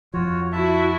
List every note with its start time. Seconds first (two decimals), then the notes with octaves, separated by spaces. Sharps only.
0.14 F2 F3 F4 F#4 C#5
0.52 E4 F#4 E5 A5